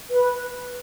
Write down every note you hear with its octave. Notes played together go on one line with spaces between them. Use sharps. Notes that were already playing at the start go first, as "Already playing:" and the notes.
B4